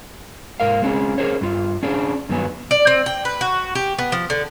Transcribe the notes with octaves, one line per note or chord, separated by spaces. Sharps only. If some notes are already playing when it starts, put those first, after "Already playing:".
G#2 A#4 F5
G#3 C4 C#4 G#4
C#4 G#4 A#4 C5 C#5
G2 F4
C#4 D4 G#4 C5
G2 D#3 F#3 B3 G#5
D5
C4
G5
B4
F#4
G4
B3
F3
D3